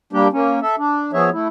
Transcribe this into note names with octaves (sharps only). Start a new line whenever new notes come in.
G3 A#3 D4 G4
A#3 C#4
A4 E5
D4
F3 B3 G#4 C#5 E5
A3 E4